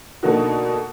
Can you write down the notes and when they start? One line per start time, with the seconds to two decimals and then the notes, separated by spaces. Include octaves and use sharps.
0.23 B2 D3 A#3 D#4 F#4